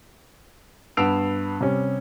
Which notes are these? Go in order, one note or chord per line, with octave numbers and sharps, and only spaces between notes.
G2 B3 E6 C7 D7 F7
C3 G3 C#4